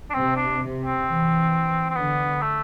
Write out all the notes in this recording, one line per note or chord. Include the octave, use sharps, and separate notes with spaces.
D4
C3 C4
D4
C3
C4
E3
C4
D3 B3
A3